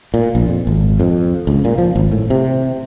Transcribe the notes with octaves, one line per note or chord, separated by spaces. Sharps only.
A#2
A#1
F2
G#1
F2
C#2
A#2
F3
G#1
A2
C3